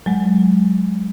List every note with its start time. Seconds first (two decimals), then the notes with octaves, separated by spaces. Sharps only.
0.06 F#3 G#3